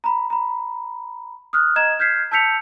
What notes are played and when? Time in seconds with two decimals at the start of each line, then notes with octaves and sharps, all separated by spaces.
0.04 A#5 B5
0.30 A#5 B5
1.53 D#6 F6 F#6
1.76 D#5 A#5 G#6 E7
1.99 F6 G6 G#6 B6 C7
2.32 A5 E6 G6 B6 C#7 F7